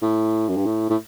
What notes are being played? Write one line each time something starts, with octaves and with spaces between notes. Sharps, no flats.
A2
F#2
G2
A2
A2